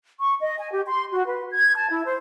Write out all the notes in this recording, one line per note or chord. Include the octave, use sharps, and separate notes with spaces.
C#6
D#5
G#5
G4
C6
F#4
B4
G#6
A5
E4
C5